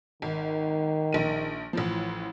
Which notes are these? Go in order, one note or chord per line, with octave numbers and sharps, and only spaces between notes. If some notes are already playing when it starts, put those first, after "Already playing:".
G#1 D#3
A#1 D#7
A1 A2 F3